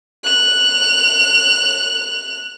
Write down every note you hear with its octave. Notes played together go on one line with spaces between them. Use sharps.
F#6 F7